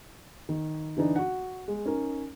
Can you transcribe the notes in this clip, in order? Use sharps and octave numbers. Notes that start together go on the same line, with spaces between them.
D#3
D3 E3 D4 D#4
F#4 F#5
G#3
C#4 D#4 A#4